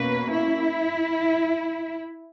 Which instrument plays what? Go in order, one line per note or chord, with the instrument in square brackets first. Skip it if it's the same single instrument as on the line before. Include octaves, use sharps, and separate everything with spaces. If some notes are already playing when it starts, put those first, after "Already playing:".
Already playing: [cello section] B2 A#3 C#4 B4
E4